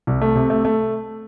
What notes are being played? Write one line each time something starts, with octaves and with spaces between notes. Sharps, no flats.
C2
A3
C3
A3
A3